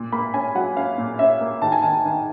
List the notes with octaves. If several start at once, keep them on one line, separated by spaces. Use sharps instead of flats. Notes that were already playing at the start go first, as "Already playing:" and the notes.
Already playing: A#2
A#3 B5
C#4 G#5
F#3 F#5
C#4 F5
A#2
C#4 E5
A#3
D#3 A5
G#5
D#3 A5
D#3